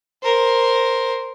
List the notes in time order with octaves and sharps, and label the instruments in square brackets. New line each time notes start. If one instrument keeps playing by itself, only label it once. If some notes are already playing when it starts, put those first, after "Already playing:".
[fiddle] A#4 C5